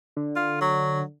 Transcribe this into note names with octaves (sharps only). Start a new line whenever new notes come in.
D3
F4
F#3